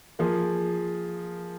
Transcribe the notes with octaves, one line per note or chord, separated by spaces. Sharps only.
F3 A#3 F4 G#4